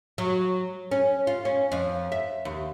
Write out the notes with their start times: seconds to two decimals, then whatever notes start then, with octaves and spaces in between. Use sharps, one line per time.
0.18 F#3
0.91 C#4
1.27 F4
1.45 C#4
1.72 F2
2.12 E5
2.45 D#2